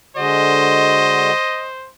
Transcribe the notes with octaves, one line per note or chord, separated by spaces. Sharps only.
D3 G#3 F#4 C5 D#5